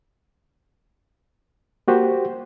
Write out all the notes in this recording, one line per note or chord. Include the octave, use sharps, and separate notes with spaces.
A#3 F#4 G4 C5